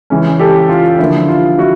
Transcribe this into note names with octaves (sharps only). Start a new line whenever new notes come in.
C#3 E3 G#3 C#4
G4 A4
F4
D3 F3 A#3 E4
F4
E4 F#4